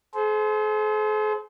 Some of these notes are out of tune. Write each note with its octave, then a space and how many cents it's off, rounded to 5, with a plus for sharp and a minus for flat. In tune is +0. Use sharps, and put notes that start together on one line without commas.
G#4 +45 C5 -10